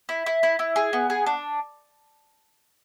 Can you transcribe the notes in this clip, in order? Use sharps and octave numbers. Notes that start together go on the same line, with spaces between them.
E4
E4
E4
E4
G#4
B3
G#4
D4